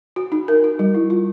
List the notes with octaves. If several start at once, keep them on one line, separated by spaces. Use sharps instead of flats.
F#4
D#4
A#4
F#4
G3
E4
F4